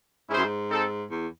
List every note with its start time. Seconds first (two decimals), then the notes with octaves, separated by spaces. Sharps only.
0.29 G#2 C#4 E4 G#4 C5
0.37 F#2
0.45 G#2
0.70 C4 D#4 A4
1.11 E2